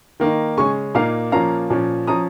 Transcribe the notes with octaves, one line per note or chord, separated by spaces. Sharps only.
D#3 A#3 D#4
C#3 G#3 C#4 G#5 C#6
A#2 A#3 D#4 F5 A#5
A#2 F3 A#3 C#4 F5 A#5
A#2 F3 C#4
F3 C#4 A#5 D#6